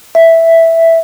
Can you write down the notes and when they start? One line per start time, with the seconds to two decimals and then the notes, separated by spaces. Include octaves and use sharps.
0.15 E5